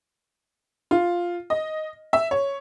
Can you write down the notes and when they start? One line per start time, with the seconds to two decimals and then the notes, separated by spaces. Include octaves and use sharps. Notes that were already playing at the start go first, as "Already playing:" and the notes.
0.91 F4
1.50 D#5
2.13 E5
2.31 C#5